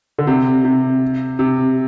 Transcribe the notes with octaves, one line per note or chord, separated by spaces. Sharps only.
D3
C3
C3
C3